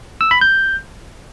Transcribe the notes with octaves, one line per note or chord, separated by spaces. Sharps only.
E6
B5
G6